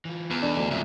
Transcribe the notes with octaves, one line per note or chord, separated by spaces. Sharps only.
E3 F4
E2 B3
D4 D#4 A4 D5
D2
F2 G#2 C#3 F4 E5